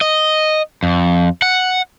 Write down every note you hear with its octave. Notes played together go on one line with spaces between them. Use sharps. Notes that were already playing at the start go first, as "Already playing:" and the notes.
D#5
F2
F#5